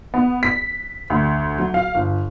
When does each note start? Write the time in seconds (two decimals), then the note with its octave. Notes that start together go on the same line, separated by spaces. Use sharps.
0.14 B3
0.43 B6
1.10 D2
1.58 F#3
1.74 F5
1.94 G1